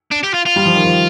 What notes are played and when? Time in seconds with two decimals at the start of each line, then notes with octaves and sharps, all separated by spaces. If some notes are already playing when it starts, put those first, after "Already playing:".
0.12 D4
0.24 G4
0.34 F4
0.46 F4
0.56 G3
0.66 F3
0.75 D#3
0.85 F3